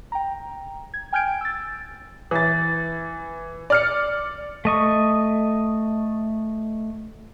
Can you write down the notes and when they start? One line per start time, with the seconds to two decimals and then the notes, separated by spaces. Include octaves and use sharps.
0.12 G5 A#5
0.94 G#6
1.13 G5 G#5 F6 G6 G#6 D7
1.41 E6 A6
2.31 E3 A6
3.70 D5 F6 C#7
4.65 A3 D#5 C#6